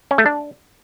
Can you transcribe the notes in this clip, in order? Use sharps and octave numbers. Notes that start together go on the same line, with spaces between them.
C#4
A3
D4